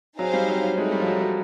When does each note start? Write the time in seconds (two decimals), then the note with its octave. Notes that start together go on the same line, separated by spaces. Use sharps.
0.19 F#3 C4 D#4 G#4 C5 F5
0.34 G3
0.48 F#3
0.63 F#3
0.78 G#3 A3 C4 D#4
0.92 G3
1.00 F3
1.07 F#3
1.21 F#3